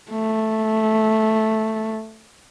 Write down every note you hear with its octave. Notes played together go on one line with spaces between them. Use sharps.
A3